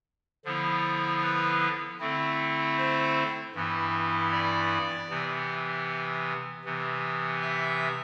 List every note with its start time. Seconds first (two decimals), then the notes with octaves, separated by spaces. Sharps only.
0.45 D3 F3 B3 E4
1.22 B4
1.99 D3 A3 C4 E4
2.77 C5
3.54 G2 E3 B3 E4
4.32 D5
5.10 C3 E3 B3
6.65 C3 E3 B3
7.42 E5